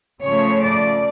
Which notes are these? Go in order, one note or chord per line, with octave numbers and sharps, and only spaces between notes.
C#3 F3 A3 C#5
D5